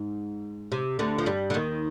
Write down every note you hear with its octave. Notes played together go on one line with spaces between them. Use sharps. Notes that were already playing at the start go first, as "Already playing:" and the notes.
Already playing: G#2
C3
D2 D3
F3
G2 G3
D3
D#2 D#3